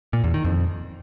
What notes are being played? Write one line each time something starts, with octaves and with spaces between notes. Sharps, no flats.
A#2
E2
D#3
F2